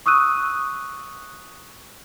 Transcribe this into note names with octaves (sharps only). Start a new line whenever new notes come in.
C#6 D#6 E6 F#6 D#7